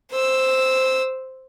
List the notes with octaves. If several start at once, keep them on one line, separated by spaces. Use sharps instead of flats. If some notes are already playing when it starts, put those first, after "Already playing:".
C5 E6